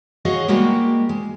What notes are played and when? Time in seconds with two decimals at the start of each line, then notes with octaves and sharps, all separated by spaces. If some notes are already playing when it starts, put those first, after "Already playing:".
0.25 F#4 G#4 C#5 D#5 F5
0.48 G3 G#3 A#3 F#4 G4
1.09 G#3